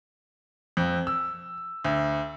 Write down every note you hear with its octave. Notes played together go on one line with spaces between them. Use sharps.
F2
E6
D2